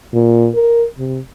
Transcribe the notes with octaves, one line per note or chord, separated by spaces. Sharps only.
A#2
A#4
C3